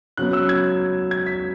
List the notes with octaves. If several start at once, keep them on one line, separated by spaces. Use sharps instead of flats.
C#3 F#3 B3 F#6
E6
G#6
G#6
B6